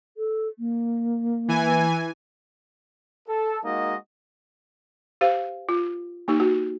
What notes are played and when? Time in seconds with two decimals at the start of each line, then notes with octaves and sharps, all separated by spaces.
0.17 A4
0.59 A#3
1.48 E3 G#5
3.28 A4
3.64 G#3 A#3 D#4 F#4 D#5
5.21 G4 C5 F5
5.69 F4
6.28 A#3 D#4 G4
6.40 F#4